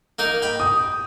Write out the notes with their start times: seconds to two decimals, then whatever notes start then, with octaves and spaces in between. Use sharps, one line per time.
0.19 A#3 D#4 A#4
0.42 G5 B5
0.60 D#6